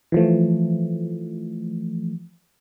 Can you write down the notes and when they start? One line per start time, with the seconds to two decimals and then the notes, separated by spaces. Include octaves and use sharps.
0.12 E3 F3 A3